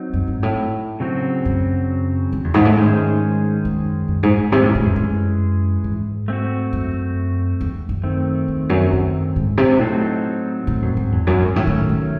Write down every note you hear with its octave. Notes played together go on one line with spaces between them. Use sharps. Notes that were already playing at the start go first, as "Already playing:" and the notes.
Already playing: F#3 C4 D#4
F#2
G#2
A2
C#3 F#3 C4 F#4
F#2
F#2
E2
G#2
A2
G#2 D#3 G#3 C#4 G#4 C5
F#2
F#2
G#2
G#2
C3 E3 G#3 C#4 G#4
A2
A2
F#2
F#2
G#2
A3 C4 F#4
F#2
E2
F#2
D#3 A3 C4
E2
F#2
F#2
G#2
C3
A2 F#3 C4 D#4 A4 C5
A2
F#2
G#2
E2
F#2
G#2
A2 D#3 F#3 A3 C#4
A2
C3